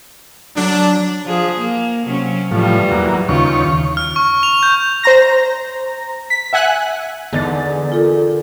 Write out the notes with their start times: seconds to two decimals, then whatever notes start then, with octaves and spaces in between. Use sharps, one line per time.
0.56 F#3 D4
1.25 F3 G#4
1.58 A#3
2.06 C3 F#3 C#4
2.51 A2 E3 F3 G3
2.92 E2 F#3 A#3
3.29 D#2 C#3 F4 C#6
3.97 F6
4.16 C#6
4.43 F7
4.63 G6
5.03 C5 A#5 A#6
6.30 B6
6.53 E5 F#5 G#5 F#6
7.33 E2 D3 D#4 A6
7.92 F4 A4 A#4